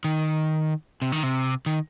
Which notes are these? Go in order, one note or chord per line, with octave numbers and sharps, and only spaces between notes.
D#3
C3
D#3
C3
D#3